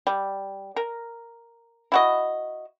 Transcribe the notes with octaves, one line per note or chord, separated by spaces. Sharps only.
G3
A#4
E4 F#4 D#5